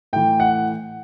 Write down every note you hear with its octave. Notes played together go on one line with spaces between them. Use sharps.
A2 E3 G5
F#5